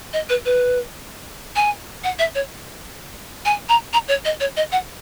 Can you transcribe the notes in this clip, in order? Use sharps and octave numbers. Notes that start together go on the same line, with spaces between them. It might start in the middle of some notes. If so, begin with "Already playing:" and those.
D#5
B4
B4
G#5
F#5
E5
C#5
G#5
A#5
A#5
C#5
D#5
C#5
D#5
F#5